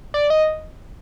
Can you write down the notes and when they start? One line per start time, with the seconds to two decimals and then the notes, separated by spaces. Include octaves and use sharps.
0.14 D5
0.30 D#5